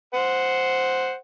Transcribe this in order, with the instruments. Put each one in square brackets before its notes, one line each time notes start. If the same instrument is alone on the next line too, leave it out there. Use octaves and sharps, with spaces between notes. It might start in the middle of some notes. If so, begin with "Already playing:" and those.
[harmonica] C5 F#5